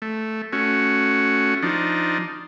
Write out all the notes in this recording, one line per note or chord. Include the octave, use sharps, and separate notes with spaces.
A3
A3 C#4 F#4
F3 D4 D#4